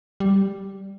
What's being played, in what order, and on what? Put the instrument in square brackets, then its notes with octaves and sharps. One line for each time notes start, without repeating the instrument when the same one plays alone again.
[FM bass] G3